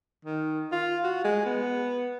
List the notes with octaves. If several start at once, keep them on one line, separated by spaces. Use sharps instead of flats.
D#3
F4
F#4
G#3
B3